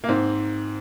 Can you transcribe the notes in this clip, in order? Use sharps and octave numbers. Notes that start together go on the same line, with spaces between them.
A#3
G#2 C4